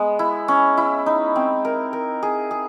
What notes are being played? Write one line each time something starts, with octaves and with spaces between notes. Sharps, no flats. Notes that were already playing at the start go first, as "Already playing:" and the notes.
Already playing: G#3 B3
E4
C#4
E4
D#4
C4
A#4
A#4
G#4
G#4